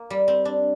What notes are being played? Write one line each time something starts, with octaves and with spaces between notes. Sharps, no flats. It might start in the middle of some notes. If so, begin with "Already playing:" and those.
Already playing: A#3
G3
C4
D4